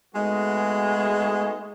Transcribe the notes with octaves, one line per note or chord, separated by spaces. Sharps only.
G#3 A3 B3 D#4 F#4 G#4